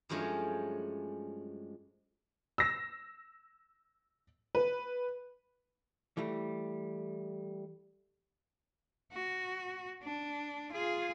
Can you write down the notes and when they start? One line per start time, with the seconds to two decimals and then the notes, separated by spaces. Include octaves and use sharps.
0.09 G2 F3 F#3 G#3 A3 C#4
2.58 E6 A#6
4.55 B4
6.17 E3 G3 A3
9.12 F#4
10.03 D4
10.72 F4 G#4